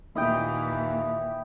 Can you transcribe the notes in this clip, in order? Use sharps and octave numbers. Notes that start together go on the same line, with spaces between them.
D#2 A#2 E3 E4 D#5 G5